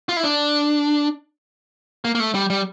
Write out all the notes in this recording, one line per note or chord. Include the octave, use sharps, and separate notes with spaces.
F4
E4
D4
A#3
A#3
A3
G3
G3